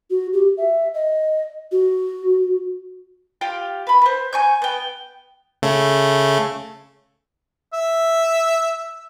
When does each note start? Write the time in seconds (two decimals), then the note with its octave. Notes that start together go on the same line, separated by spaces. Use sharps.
0.10 F#4
0.33 G4
0.58 E5
0.94 D#5
1.72 F#4
3.41 F4 G4 F5
3.87 B4 B5
4.02 B4 C5
4.33 G#5 C#6 G6
4.62 B3 G5
5.62 C#3 A3
7.74 E5